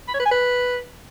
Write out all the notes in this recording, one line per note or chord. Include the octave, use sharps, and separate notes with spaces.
B5
C#5
B4
G#5
B4